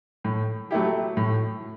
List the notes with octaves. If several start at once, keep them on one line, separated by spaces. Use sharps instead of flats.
A2
F#3 A3 E4 G4
A2